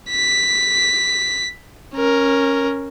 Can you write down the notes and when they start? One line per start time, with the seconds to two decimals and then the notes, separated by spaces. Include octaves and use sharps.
0.10 B6
1.95 C#4 A#4